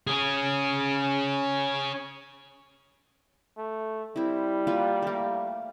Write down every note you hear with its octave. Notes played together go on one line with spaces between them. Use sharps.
C#4 G#4
A3
G3 C4 E4
A#3 F4 B4
A3 A#3